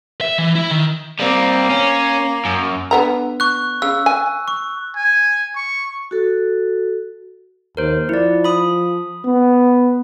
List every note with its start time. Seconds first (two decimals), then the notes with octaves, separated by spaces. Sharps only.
0.21 E5
0.39 E3
0.56 E4
0.71 D#3
1.20 G3 A#3 C4
1.71 C#4
2.45 F#2
2.91 D3 B3 A#5
3.40 C#6 F#6
3.82 C#3 E6
4.06 G#5
4.48 C#6
4.96 G#5
5.56 C#6
6.11 F#4 A4
7.77 D#2 A#4 C5
8.09 F3 E4 D5
8.44 B5 D#6
9.25 B3